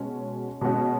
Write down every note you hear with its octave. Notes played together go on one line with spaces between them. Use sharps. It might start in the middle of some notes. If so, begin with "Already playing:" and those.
Already playing: B2 G#3 C#4 F#4
B2 G#3 C#4 F#4